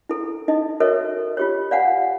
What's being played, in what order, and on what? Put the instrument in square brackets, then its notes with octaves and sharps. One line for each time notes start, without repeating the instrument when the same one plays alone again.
[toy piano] E4 A4
D#4 D#5
F#4 A4 A#4 C#5 D#5 E5
F4 G4 C#5
D5 F5 F#5 G#5